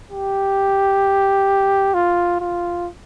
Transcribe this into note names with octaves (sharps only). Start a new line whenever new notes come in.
G4
F4
F4